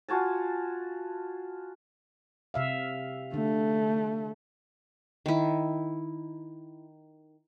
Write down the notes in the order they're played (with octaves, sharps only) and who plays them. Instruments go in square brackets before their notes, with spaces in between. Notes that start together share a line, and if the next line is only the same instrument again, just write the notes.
[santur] F4 F#4 G#5 A5
[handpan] C3 E5 F5
[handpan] D3 [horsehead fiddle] A3
[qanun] D#3 E4